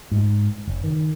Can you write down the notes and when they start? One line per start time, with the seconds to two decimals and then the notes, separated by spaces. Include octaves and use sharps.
0.12 G#2
0.67 F#1
0.84 D#3